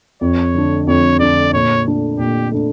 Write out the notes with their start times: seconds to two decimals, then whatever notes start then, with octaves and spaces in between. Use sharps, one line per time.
0.21 F2 C#5
0.54 D3 A3 D4
0.87 F2 C#5
1.20 D3 A3 D4 D5
1.53 A#2 C#5
1.86 A3 D4
2.19 A#2 G4
2.51 A3 D4